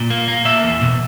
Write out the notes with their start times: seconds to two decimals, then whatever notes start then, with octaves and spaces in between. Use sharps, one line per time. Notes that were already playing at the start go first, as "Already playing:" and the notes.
Already playing: A#2
0.10 A#3
0.28 A#3
0.45 A#3 E5
0.63 E2
0.81 B2